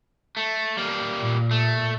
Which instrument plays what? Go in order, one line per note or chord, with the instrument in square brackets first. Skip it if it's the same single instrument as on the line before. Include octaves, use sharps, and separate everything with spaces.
[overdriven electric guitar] A3
G3 A#3
[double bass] A#2
[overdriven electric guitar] A3